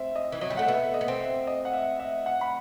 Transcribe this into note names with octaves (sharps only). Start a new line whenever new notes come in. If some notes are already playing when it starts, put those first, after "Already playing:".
Already playing: C4 E5
D#5
E3
F#3 D#5
G3
A3 F#5
B3 E5
D#5
B3
C4
E5
D#5
F#5
E5
E5
F#5
B5